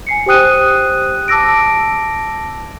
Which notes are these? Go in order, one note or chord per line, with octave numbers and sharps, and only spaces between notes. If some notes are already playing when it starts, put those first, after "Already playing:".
G#5 C7 C#7
G4 C5 G5 D#6 F#6 D#7
A5 D6 E6 A#6 D7